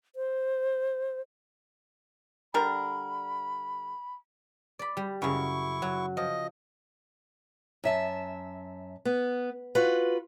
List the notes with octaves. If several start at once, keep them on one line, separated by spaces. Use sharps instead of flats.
C5
D3 G3 A#4 B5
D5 B5
G3
F#2 C#3 E4 C#6
F#3
F3 D#5
F#2 E5 A5
B3
F4 F#4 B4